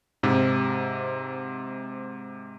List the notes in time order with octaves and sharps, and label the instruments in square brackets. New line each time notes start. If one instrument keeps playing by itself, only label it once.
[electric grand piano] G#2 C3